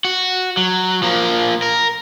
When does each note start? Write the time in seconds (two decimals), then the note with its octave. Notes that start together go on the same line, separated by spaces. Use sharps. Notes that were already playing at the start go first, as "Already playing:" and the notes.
0.05 F#4
0.57 F#3
1.03 F3 A#3
1.62 A#4